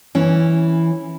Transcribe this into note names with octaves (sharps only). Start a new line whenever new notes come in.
E3 C#4